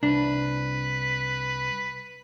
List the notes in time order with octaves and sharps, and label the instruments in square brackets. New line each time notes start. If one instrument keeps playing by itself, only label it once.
[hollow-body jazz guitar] C2 D4 [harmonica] B4